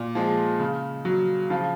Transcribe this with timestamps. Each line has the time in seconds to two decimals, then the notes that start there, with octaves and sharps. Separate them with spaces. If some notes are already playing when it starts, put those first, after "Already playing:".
Already playing: A#2
0.15 F3 G#3
0.60 C#3
1.05 F#3
1.50 C#3 F3 F4